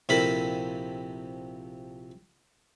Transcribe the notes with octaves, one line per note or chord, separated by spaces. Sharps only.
A#1 C3 E4 A4 A#4 B5